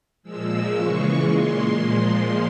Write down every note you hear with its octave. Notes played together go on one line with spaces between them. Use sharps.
A#2 F3 G#3 E6
C#3 E3 G#3 C#6
A#2 G#3 C6
A#2 F3 G#3